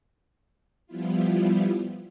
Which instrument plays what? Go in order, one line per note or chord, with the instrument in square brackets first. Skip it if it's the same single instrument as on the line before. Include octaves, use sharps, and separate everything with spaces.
[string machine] F3 G3 B3 E4 F4